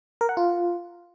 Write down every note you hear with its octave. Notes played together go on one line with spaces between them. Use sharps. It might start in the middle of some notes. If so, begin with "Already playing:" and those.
A#4
F#5
F4